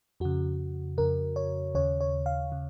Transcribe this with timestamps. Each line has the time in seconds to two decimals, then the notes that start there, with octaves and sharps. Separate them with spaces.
0.20 F2 C#3 F#4
0.98 F2 C#3 A#4
1.36 C#5
1.75 D#2 C#3 C#5
2.01 C#5
2.26 F5
2.52 C#3